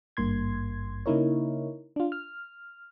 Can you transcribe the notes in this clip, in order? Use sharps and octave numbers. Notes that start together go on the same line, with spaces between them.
G#1 G2 A#3 C6 G#6
C#3 A#3 D#4 E4 A#4 C#5
D4 F4
F6